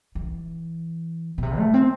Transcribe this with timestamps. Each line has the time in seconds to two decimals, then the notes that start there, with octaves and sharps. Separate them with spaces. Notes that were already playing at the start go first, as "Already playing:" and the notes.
0.15 E3
1.38 B2
1.43 C3
1.58 A3
1.74 C4